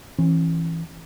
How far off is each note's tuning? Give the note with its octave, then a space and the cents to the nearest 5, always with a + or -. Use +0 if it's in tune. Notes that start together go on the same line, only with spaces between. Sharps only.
E3 +0 C#4 -35